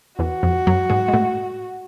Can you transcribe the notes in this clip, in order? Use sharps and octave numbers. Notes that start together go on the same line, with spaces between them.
E2 E3 F#4
F2 F3
F#2 F#3
G#2 G#3
G#3
A2 A3